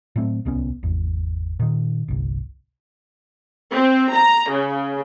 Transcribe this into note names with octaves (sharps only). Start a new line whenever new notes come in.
A2 F#3 A3 C4
D1 C2 B3 C#4
G#1 E2
A#2 D#3
G1 C2
C4
A#5
C#3